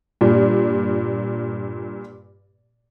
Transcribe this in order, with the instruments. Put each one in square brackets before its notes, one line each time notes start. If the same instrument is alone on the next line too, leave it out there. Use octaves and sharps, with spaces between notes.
[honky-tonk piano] G2 A#2